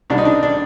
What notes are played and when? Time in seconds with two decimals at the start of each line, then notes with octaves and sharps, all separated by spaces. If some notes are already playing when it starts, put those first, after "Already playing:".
0.10 C2 C3 D#3 D4
0.18 D#4
0.25 D4
0.43 D4